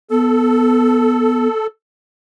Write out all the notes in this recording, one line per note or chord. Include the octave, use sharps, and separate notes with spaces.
B3 A4